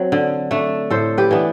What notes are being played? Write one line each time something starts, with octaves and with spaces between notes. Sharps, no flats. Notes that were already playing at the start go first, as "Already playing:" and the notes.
Already playing: F#3 C4
D3
A3 D4
A2 A4 C5
G4 B4
E3 B3 D4